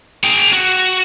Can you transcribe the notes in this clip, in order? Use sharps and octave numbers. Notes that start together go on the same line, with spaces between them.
G#4 G5
F#4